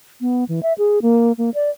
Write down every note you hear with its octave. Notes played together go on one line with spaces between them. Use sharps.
B3
E3
E5
G#4
A#3
A#3
D5